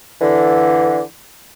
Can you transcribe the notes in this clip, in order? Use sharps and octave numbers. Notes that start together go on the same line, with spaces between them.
D3 E3